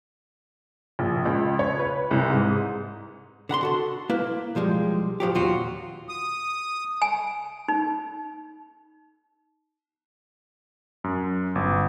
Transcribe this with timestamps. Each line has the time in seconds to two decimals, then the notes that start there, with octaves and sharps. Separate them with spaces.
0.99 A#1
1.25 C#2
1.59 C#5
1.79 B4
2.11 C2
2.30 G#2
3.49 D3 F#5 B5 C6
3.63 F#4 A4
4.10 A#3 E4 B4
4.55 B1 F3 G3 G#3
5.20 A2 F3 F#3 G4
5.35 D#2 A#2 F4 F#4
6.09 D#6
7.02 G#5
7.68 D#4
11.04 F#2
11.55 G1